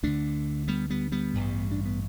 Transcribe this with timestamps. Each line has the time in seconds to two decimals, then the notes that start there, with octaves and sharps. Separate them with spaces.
0.03 D2 D3 A3 D4
0.68 G3 B3
0.90 G3 B3
1.12 G3 B3
1.34 A1 G2 D3
1.71 D4
1.85 B3